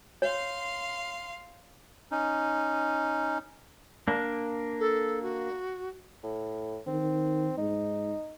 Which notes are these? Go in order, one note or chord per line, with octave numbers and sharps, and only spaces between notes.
C#5 F5 C6
C#4 D#4
A#3 D4
A4
F#4
A2
D#3 C4
G#2 D#4